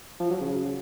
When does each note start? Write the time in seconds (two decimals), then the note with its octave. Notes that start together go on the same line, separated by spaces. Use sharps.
0.20 F3
0.31 F#3
0.41 C#3